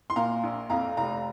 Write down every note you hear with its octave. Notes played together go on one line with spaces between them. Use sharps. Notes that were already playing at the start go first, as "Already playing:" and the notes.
C6
A#2 F5 A#5
A#1
F2 F5 A#5
F1 F5 A#5